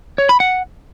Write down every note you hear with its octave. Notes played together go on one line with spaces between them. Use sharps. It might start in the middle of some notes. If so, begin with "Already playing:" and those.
C#5
B5
F#5